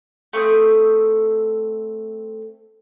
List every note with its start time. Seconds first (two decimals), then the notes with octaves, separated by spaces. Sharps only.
0.33 A3 C4 D#6 G6